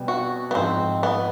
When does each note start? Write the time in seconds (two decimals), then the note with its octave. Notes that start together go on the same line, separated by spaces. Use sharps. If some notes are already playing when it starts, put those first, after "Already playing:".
Already playing: B2 G3 C4
0.08 F#4
0.51 B3
0.55 G#2 F3 G#3 C4
1.03 B3